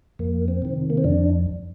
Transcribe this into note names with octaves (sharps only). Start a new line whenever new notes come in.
F2 A#3
C4
C3 D#3
A#3
C4
F2 D4